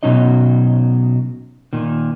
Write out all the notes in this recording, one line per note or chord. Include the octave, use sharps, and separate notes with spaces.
B2 E3 F#3 C#4 D#4 D#5
A#2 D#3